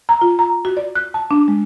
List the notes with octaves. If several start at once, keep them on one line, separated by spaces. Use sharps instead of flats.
A#5
F4
A#5
F#4
D5
F#6
A5
D4
G#3